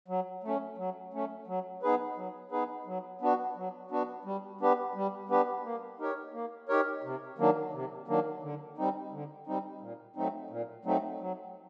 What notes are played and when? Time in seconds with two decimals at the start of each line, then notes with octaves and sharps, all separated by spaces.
0.08 F#3
0.43 A3 C#4
0.78 F#3
1.13 A3 C#4
1.47 F#3
1.83 B3 D#4 G#4 B4
2.16 F#3
2.51 B3 D#4 G#4 B4
2.86 F#3
3.21 B3 D4 F#4
3.56 F#3
3.90 B3 D4 F#4
4.25 G3
4.61 B3 D4 G4 B4
4.95 G3
5.29 B3 D4 G4 B4
5.64 A#3
5.99 D#4 G4 A#4 C#5
6.34 A#3
6.69 D#4 G4 A#4 C#5
7.04 C3
7.38 D#3 F#3 A#3 D4
7.73 C3
8.08 D#3 F#3 A#3 D4
8.43 D3
8.77 G3 C4 D#4
9.12 D3
9.47 G3 C4 D#4
9.81 A#2
10.16 F#3 A3 C4 D#4
10.50 A#2
10.85 F#3 A3 C4 D#4
11.20 F#3